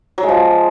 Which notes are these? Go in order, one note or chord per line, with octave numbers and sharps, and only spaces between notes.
F#3
G#3
F3